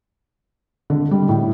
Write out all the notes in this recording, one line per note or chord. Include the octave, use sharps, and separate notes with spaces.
D3
G3
A2